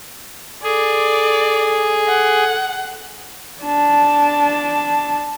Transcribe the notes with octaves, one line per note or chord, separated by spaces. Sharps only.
G#4 A4 D5
F#5
D4 A5